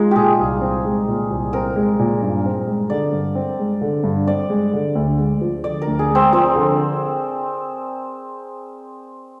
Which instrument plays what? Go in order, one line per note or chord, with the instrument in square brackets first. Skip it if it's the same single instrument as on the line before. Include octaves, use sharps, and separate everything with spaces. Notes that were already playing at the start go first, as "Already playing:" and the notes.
Already playing: [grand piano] G#3 [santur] D#4 F4
[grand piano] A#2 [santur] G4 G#4
[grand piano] C2
C4
G#3
A#2
C2
[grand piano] C4 [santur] A#4
[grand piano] G#3
A#2
G2
C4
G#3
[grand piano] D3 [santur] D5
[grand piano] G2
C4
G#3
D3
G2
[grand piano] C4 [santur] D5
[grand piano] G#3
D3
D2
G#3
F3
[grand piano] D3 [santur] D5
[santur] A#4
[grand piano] D2
[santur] G#4
[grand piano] G#3 [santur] C4
[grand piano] F3 [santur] C4
[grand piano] D3